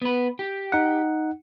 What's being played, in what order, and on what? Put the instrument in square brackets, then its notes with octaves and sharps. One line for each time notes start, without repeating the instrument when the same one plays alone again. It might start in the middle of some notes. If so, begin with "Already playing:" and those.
[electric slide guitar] B3 B4
G4
[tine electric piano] D#4 F#5